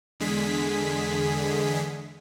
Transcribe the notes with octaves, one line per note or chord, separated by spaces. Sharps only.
E2 D3 G#3 G#4 B6